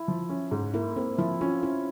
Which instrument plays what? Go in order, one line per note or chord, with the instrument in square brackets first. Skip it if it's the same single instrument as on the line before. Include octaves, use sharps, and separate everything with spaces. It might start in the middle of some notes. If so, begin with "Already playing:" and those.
Already playing: [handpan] E4
[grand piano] F3
C#4
G#2
[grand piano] A#3 [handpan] E4
[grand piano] A#3 [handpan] C4
[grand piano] F3 [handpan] E4
[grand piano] C#4 [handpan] F4
[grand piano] C#4 [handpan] E4